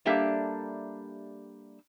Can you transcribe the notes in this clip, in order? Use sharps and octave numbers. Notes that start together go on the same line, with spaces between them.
G3 A#3 D4 G4 A4 E5